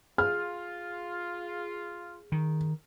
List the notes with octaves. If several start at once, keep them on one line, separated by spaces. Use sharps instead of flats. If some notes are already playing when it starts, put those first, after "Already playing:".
F4 G#4 F6
D#3